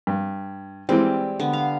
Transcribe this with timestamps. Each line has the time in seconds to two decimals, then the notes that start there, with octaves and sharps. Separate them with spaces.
0.07 G2
0.89 E3 G3 G#3 C4
1.39 D3 B3
1.53 F5